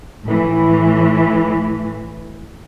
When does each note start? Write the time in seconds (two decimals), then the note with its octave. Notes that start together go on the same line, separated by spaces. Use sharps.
0.24 A2 E3